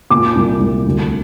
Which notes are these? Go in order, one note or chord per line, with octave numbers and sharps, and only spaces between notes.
A#2 D6
C2
C2
D2